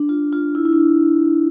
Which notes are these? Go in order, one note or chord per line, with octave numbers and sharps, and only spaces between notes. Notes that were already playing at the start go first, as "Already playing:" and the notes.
Already playing: D4
F4
F4
E4
E4
D4